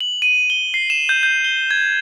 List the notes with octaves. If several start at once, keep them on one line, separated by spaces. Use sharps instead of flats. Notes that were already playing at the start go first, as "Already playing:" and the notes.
F#7
D#7
G7
C7
E7
G6
G6
G7
G#6